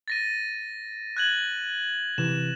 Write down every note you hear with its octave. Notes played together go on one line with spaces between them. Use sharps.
A6 A#6 D#7
F#6 G#6 F#7
C3 E3 E7